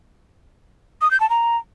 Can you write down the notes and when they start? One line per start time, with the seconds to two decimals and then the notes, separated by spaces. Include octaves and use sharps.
1.01 D#6
1.11 G6
1.20 A5
1.30 A#5